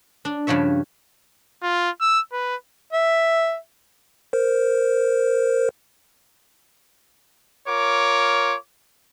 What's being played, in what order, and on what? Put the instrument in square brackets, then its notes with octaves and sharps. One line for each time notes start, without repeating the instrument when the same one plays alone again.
[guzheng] D4
G2 C#3 F3 C#5 E5
[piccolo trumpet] F4
E6
B4
[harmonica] E5
[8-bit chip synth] A#4 C5
[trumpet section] F4 A#4 C#5 D6